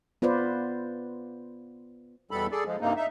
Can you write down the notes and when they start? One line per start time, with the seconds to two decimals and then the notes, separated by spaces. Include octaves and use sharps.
0.22 B3 F4 B4 C5 D5
2.31 E2 B2 G3 A4 B5
2.51 G#4 A4 D5
2.66 F3 G#3
2.81 G2 C3 A#3 D#4
2.97 D#4 E5